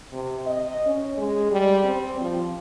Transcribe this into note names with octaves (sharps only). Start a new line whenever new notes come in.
C3
D#5
C#4
G#3
G3
C4
F3